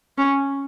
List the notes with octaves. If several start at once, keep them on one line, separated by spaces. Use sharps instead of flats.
C#4